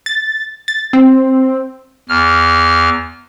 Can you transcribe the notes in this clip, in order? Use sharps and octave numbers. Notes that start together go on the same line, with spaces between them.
A6
A6
C4
E2 F6